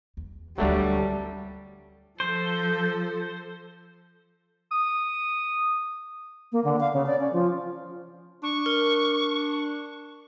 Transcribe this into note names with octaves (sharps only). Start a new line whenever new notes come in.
E2
D2 A2 F#3 G3 A3 D4
F3 A4 C5
D#6
A#3
D3
F5
C#3
D5
C#4
F3
D4 C#6
A#4